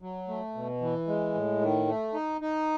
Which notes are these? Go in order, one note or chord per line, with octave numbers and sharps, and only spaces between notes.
F#3
A3
B2
E3
G#3
A2
D#3
A3
D#4
D#4